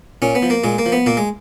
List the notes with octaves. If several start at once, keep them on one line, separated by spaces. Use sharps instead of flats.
A#2 C#4
B3
F3
A#3
A#2 G#3
A#3
F3
B3
A#2 A#3
G#3